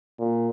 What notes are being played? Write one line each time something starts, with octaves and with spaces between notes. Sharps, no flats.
A#2